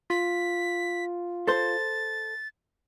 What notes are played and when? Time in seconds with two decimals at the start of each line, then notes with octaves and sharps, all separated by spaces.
0.10 F4 B6
1.47 A4 C5 A6